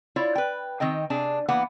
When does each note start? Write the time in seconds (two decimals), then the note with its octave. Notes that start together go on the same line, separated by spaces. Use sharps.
0.16 E4 F4 C#5 D5
0.35 B4 G5
0.80 D#3 C4 D#5 G5
1.10 C3 D4 G#4
1.48 E3 A#3 B3 F#5